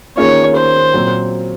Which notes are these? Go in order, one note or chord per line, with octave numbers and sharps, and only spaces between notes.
D#3 A#3 C#4 F4 G#4 C#5
C5
A#2 F#3 C4